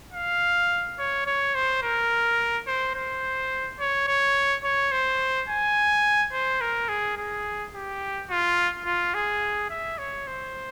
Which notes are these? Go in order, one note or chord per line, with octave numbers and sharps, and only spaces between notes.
F5
C#5
C#5
C5
A#4
C5
C5
C#5
C#5
C#5
C5
G#5
C5
A#4
G#4
G#4
G4
F4
F4
G#4
E5
C#5
C5